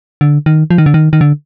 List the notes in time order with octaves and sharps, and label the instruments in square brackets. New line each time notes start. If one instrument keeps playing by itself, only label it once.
[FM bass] D3
D#3
F3
D#3
D3
D#3
D#3
D3